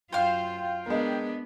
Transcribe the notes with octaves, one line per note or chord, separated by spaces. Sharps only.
F#2 F4 C5 F5 G5
G#3 B3 D4 A#4